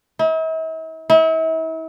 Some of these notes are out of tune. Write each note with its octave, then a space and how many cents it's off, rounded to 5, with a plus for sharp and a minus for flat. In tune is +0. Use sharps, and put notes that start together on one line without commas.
E4 -45
E4 -40